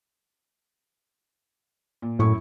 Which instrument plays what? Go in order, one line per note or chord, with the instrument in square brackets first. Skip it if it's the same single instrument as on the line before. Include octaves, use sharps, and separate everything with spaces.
[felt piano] A#2
[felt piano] F#2 E4 C#6 [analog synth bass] A2